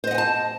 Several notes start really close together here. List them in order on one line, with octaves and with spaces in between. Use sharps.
C5 D#5 F#5 G#5 A5